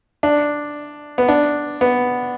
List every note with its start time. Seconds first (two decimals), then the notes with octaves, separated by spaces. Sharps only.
0.23 D4
1.18 B3
1.28 D4
1.81 B3